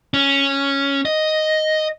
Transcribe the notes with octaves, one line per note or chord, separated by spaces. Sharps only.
C#4
D#5